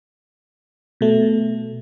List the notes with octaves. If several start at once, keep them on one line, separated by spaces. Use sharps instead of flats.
B2 A3